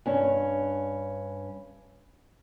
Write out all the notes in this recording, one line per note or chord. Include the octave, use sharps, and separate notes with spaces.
G2 C#4